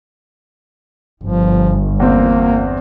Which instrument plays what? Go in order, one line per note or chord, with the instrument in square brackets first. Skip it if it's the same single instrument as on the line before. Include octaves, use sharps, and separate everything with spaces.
[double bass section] G1 [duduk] F3
[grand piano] E2 C4 [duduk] A#3